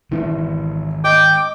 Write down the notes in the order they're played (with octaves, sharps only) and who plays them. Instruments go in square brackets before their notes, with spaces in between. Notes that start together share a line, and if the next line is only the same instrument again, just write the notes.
[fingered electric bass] D#3 G#3 C#4 [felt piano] E3
[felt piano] D#5 [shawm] G5 [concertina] D6